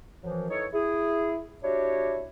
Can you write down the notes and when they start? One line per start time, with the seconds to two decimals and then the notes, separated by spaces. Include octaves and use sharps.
0.23 F#2 E3 F3
0.50 E3 D#4 A4 C#5
0.73 E4 G#4
1.63 D4 E4 F#4 G4 C#5